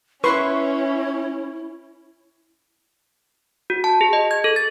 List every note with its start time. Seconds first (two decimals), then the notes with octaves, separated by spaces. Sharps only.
0.24 C#4 E4 B4 E5 C6 C#6
3.70 F#4
3.84 A5
4.01 G#4
4.13 D#5
4.31 G#6
4.44 A4
4.56 A6